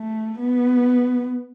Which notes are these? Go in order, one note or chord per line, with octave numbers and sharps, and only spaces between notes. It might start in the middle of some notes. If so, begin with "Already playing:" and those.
Already playing: A3
B3